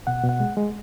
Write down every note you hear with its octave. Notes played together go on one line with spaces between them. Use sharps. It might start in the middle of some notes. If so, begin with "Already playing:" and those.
B2 F#5
B2
F#5
G#3
G#3